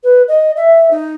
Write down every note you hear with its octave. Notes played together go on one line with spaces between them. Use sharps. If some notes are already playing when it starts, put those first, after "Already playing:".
B4
D#5
E5
D#4